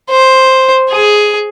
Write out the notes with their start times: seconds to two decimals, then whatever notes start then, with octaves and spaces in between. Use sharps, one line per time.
0.10 C5
0.91 G#4